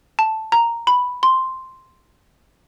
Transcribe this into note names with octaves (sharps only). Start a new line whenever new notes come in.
A5
A#5
B5
C6